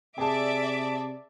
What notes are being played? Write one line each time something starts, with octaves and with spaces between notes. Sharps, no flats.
C3 G#4 D5 E5 A5 D6